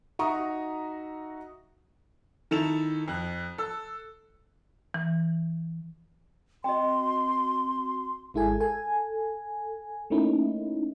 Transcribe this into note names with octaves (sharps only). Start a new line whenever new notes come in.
D#4 F#4 E5 A#5 C#6 D#6
D#3 E4 A4 E7 F7
F2 F#6
A4 E6
E3
C4 F#4 D#5 G5 C6
G#1 G#3 E4 G#4 A4 G#5
A4 G#5
A3 A#3 C#4 D#4 E4